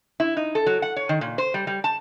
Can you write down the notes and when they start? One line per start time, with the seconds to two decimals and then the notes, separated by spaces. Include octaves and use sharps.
0.20 E4
0.37 D#4
0.55 A4
0.66 F#3
0.82 F#5
0.96 C#5
1.09 D#3
1.21 A#2
1.38 C5
1.54 G3
1.67 G3
1.84 A5